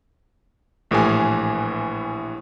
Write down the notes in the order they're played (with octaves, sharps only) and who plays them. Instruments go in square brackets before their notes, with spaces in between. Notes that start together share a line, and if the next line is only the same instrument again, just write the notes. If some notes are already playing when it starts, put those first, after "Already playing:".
[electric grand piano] A#1 A2 E3 G4 G#5